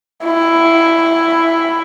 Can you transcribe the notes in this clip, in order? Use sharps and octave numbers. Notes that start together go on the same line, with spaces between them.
E4